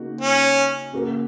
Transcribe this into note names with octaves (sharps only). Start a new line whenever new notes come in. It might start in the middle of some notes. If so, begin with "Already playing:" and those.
Already playing: C#3 A#3 D#4 F#4
C#4
C#3 A#3 F#4 A#4